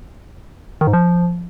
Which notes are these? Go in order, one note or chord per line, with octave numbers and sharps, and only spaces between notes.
D#3
G#2
F3